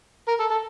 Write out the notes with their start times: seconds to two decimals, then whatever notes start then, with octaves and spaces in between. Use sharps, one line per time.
0.28 A#4
0.40 A4
0.51 A4